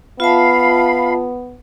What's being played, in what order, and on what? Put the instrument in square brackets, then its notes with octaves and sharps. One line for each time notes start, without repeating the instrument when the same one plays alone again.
[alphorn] B3 [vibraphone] F4 E5 A5 [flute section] F5 B5